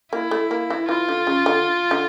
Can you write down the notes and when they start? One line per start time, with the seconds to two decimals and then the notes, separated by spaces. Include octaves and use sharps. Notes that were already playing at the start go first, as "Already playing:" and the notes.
0.12 A#3 E4
0.31 A3
0.51 A#3
0.70 E3
0.89 E3 F4
1.08 D3
1.27 C#3
1.46 D3
1.91 D3